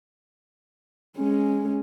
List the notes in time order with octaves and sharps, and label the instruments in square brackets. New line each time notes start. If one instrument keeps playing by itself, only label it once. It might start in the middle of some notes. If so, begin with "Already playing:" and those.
[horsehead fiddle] G#3 C#4